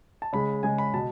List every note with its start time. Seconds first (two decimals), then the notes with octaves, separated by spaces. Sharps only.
0.22 A5
0.33 C#3 G#3 B5
0.63 C#3 G#3 G#5
0.78 B5
0.93 B2 A5